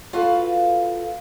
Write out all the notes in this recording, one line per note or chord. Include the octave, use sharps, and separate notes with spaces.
F4 F#4 A4 B4 F5